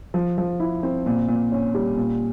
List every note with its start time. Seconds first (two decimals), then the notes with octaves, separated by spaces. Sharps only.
0.14 F3
0.38 F3
0.60 E4
0.83 C4
1.06 A#2
1.28 A#2
1.52 C#4
1.75 G3
1.97 A#2